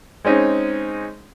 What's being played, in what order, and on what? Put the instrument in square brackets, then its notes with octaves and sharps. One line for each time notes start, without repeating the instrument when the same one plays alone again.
[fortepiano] G#3 C4 C#4 D#4